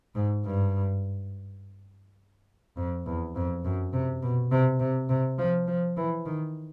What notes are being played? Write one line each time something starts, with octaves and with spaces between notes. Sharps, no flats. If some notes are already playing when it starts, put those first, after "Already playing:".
G#2
G2
F2
E2
F2
F#2
C3
B2
C3
C3
C3
F3
F3
E3
D#3